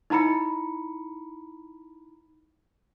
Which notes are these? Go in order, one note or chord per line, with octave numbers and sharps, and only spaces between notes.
D#4 E4 A#5 B5 C#7